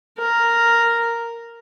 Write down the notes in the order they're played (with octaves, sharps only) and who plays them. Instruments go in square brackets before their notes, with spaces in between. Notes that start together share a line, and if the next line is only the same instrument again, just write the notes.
[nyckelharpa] A#4